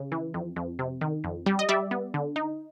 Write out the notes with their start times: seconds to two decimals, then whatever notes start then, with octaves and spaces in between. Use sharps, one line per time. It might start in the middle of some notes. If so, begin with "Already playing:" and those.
Already playing: C#3
0.12 E3
0.34 F2
0.56 F2
0.79 C3
1.01 D#3
1.24 F2
1.46 G3
1.59 D#5
1.69 G3 D5 E5
1.91 B3
2.14 D3
2.36 D#4